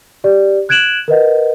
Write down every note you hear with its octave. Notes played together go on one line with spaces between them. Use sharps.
G4 D5
F#6 G#6 D7 E7 F#7
A#4 B4 D#5 F#5